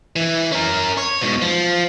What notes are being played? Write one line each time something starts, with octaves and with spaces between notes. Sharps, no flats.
E3
C#4 A#4
C#5
G#2 B2
F3